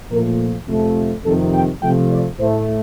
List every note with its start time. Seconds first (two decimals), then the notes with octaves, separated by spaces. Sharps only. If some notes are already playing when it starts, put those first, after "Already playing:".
0.10 A#2 F3 A3 A#4
0.68 F2 C3 F3 A3
1.24 F2 C3 D#3 A4
1.53 G5
1.81 C3 F3 A3 G5
2.10 D5
2.38 A2 A3 C5